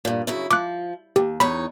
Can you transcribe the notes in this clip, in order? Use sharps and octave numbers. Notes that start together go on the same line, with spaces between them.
G2 A#2
F#2 C#3 E4
F3 D6 F#6
D#2 G4
E2 D#4 C#5 B5